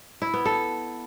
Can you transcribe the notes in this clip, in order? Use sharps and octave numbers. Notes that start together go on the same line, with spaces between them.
E4
B3
A4